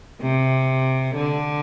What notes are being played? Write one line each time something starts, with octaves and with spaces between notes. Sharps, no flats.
C3
D3